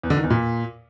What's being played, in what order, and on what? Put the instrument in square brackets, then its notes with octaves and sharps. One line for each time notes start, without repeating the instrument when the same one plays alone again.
[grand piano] E2
D3
D#3
E2
A#2